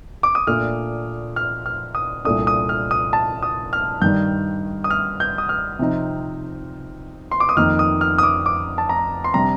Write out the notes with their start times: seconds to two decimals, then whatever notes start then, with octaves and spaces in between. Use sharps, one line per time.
0.23 D6
0.35 D#6
0.47 A#2 A3 D4 F6
1.36 F6
1.66 F6
1.95 D#6
2.25 C2 A#2 A3 D4 D#6
2.47 D#6
2.69 F6
2.91 D#6
3.13 A5
3.42 D#6
3.73 F6
4.02 G2 D#3 G3 G6
4.84 D#6
4.90 F6
5.20 G6
5.38 D#6
5.49 F6
5.79 C3 F3 C4 D#4
7.31 C6
7.40 D6
7.49 D#6
7.56 F2 D#3 A#3 D#4 F6
7.79 D#6
8.01 F6
8.18 D#6
8.23 D6
8.46 D6
8.78 A5
8.89 A#5
9.24 C6
9.34 C3 G3 D4 A#5